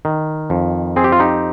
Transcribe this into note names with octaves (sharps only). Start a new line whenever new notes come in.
D#3
F2
C4 G#4
G4
F4
D#4 G4